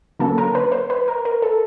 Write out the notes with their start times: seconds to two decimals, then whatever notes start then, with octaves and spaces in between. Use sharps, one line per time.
0.19 D3 F#3 A#3 C#4 A4
0.38 A#4
0.55 B4
0.72 C5
0.90 B4
1.08 A#4
1.25 A#4
1.42 A4